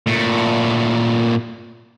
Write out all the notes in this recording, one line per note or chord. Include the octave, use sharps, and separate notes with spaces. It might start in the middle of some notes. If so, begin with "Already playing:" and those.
A#2 A3